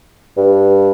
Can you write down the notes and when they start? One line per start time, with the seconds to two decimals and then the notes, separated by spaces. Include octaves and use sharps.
0.37 G2